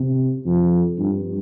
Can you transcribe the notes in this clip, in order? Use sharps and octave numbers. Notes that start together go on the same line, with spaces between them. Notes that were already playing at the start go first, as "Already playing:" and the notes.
Already playing: C3
F2
G2